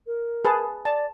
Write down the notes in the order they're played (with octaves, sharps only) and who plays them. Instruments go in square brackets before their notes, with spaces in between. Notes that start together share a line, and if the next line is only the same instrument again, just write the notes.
[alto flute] A#4
[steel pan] G#4 B4 A5
[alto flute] D5 [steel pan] A5